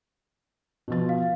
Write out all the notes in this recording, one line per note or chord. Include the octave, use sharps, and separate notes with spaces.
B2 F3 A6
F5